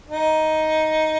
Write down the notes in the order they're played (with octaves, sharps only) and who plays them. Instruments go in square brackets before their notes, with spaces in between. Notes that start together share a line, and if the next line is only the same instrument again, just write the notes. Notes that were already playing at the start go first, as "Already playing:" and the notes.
[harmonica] D#4